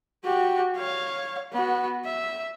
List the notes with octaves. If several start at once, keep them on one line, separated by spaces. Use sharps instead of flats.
F#4 G4
C#5 F5
B3 F#4
E5